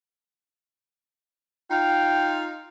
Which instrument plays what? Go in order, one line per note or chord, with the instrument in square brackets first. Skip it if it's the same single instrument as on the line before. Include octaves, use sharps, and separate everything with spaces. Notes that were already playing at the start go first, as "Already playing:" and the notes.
[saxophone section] D#4 F4 [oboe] G5